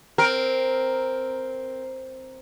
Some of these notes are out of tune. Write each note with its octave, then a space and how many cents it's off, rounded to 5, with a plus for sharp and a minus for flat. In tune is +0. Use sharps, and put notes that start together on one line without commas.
C4 +0 A#4 +0